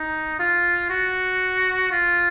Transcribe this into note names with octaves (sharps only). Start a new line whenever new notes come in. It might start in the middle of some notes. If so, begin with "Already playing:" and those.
Already playing: D#4
F4
F#4
F4